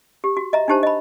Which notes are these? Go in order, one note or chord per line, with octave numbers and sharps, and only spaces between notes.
G4
F#4
D#5 E5 A#5
D4 D#4 G4 C5 A5
D#5 B5